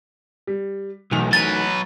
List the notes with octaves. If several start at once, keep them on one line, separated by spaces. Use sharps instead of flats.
G3
B1 E3 A3 D#4 F#4 F7
F#3 B4 A6